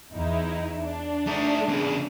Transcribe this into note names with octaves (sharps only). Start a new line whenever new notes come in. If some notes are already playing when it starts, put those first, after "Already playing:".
E2 D#4 E4
D4
A3 D#4
E2 C#3